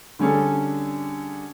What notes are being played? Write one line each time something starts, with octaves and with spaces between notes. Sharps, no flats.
D3 G3 C#4 G#4 A4